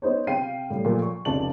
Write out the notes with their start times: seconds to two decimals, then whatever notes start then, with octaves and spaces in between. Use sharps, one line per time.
0.02 B3 D#4 C5 C#5
0.27 C3 F5 G5 C7 D#7
0.70 A2 G3
0.85 A#2 F3 A3 A#3
1.02 C#6
1.25 F1 C#2 C3 D5 A5 F#7